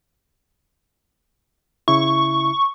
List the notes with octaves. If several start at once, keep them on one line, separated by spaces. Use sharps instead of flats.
C#3 E4 C#6